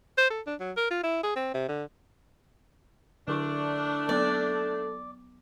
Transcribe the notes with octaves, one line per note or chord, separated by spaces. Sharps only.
C5
A4
D4
F#3
A#4
F4
E4
G#4
C4
C3
D3
D3 A3 D4 E4 C#6
F#3 B3 A4 D5